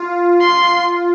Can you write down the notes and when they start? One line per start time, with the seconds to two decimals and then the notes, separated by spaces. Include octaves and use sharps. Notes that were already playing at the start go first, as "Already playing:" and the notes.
Already playing: F4
0.41 F4 C6